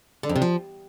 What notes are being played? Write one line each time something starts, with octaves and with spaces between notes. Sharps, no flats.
D3
F2
C3
F3